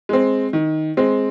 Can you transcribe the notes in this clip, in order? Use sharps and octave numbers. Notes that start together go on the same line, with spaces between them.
G#3 C4
D#3
G#3 C4